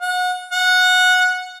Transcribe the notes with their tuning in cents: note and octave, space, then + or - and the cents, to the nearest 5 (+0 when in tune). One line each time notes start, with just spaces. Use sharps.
F#5 -30
F#5 -15